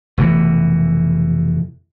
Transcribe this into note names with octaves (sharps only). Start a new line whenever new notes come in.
F1 B2 E3